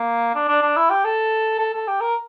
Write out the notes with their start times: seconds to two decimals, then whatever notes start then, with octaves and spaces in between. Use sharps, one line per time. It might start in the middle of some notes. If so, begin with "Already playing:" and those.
Already playing: A#3
0.35 D4
0.48 D4
0.62 D4
0.77 E4
0.90 G4
1.04 A4
1.59 A4
1.74 A4
1.88 G4
2.01 A#4